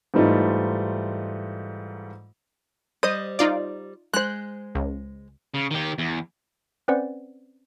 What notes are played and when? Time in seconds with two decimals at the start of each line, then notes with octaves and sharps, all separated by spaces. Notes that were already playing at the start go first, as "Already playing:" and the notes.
0.14 G#2 E3 G3 A3 D#4 F4
3.03 G3 C5 D#5 D#6
3.39 D#4 F4 D5
4.14 G#3 C5 F#6
4.75 C#2
5.54 C#3
5.71 D#3 G4
5.98 E2
6.88 C4 C#4 B4 C5 D5 F#5